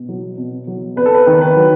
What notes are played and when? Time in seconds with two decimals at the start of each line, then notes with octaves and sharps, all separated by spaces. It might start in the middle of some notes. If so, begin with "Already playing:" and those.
Already playing: B2
0.09 F#3
0.38 B2
0.67 F#3
0.96 E2 B4
1.06 A4
1.15 B4
1.27 D#3
1.41 B4
1.56 F#3